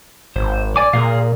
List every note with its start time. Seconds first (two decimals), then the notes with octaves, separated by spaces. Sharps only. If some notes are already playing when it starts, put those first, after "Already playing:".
0.36 G#1 C5
0.76 D5 G#5 D6
0.93 A#2 G#4 A#4 F5